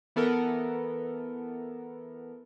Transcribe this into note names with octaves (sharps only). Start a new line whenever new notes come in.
E3 B3 A4 A#4